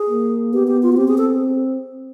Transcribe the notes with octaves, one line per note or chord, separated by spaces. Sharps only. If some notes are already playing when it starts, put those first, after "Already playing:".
Already playing: G#4
A#3
B3 G4
G4
F4
F#4
C4 G4
G#4
A4